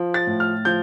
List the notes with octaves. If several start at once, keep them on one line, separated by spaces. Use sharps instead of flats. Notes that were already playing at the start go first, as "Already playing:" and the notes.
Already playing: F3
A6
A2
F6
F3 G6